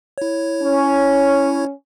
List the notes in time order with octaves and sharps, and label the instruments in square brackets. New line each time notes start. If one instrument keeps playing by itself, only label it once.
[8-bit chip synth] E4 C#5
[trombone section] C#4